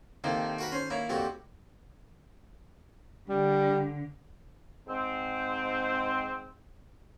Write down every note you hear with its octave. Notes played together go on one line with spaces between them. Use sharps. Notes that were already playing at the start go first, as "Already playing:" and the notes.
C3 D#3 A#3 A4
F#4 A#4 B4
C#4 C5 C6
A#3 E4 C#5
A#1 F2 F#4 G4
D3 G3
G#2 C4